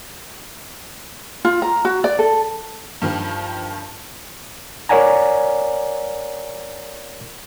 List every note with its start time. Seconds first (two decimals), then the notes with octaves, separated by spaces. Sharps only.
1.45 F4
1.62 A#5
1.85 F#4
2.04 D5
2.19 A4
3.02 G2 D#3 F3
4.89 A#4 C#5 D5 F#5 G#5 A#5